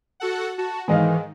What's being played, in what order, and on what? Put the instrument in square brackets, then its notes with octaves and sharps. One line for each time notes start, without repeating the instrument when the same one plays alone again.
[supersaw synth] F#4 A4 F#5
[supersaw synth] F#4 [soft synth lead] A5
[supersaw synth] G#2 D#3 [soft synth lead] E3 [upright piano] G#3 D#5 F5